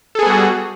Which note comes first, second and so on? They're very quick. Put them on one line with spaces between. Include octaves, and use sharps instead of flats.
A4 G#4 B3 G3 F#4